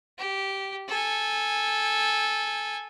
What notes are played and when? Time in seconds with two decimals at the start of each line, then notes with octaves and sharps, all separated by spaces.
0.19 G4
0.89 A4 G#5